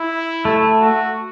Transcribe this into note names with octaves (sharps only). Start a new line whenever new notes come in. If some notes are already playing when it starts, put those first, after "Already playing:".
Already playing: E4
A3
F#4